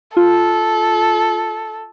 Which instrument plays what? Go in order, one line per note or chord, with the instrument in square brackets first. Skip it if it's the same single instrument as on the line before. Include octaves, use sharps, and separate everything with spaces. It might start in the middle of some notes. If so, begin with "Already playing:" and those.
[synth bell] F4 [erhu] A4